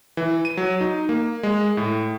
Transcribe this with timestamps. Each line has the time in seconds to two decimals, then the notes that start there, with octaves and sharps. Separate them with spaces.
0.17 E3
0.45 D#7
0.57 F#3
0.81 D#4
1.09 A#3
1.43 G#3
1.77 A2